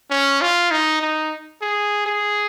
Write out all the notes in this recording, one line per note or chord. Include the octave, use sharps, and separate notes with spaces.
C#4
F4
D#4
D#4
G#4
G#4